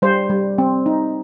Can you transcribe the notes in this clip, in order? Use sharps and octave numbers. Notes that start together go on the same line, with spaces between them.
G3 C5
G3
C4
D#4